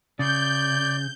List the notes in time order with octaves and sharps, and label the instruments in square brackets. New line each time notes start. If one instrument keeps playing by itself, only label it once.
[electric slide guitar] C#3 [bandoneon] D5 [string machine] G6